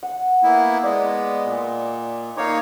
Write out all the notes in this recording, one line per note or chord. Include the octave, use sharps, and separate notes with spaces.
F#5
A#3 B3 E4
G#3 B3 D5 D#5
A#2
A#3 D#4 C#5 F5 D6